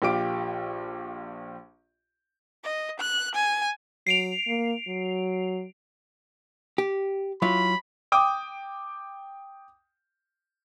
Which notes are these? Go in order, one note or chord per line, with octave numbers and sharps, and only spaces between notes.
A#1 F4 G4 D6 D7
D#5
F#6
G#5
F#3 C7 D7 F7
A#3
F#3
G4
F#3 E4 F4 B5
G5 D6 D#6